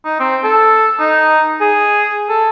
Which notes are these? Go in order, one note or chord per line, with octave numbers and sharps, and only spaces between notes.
D#4
C4
A4
D#4
G#4
A4